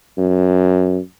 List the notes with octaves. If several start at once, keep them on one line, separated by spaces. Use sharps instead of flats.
F#2